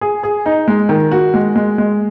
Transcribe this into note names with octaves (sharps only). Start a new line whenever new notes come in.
G#4
G#4
D#4
G#3
D#3
F#4
G#3
G#3
G#3